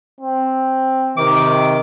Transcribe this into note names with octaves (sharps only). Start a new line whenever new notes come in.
C4
C3 D#3 D6